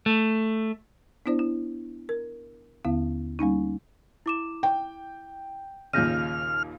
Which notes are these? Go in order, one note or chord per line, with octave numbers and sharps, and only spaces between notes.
A3
B3 D4 E4 C5 D5
E4
A#4
D#2 D3 B3 E4 F5
G3 A#3 C#4 D#4
E4 D6 E7
G5
D#2 A#2 C#3 F6 G6 A#6 D#7